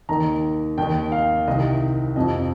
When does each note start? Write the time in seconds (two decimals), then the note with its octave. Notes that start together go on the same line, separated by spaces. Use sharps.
0.09 D#2 D#3 A#5
0.78 D#2 D#3 G5
1.12 F5
1.48 C2 C3 D#3 D#5
2.16 F2 C3 F3 D#5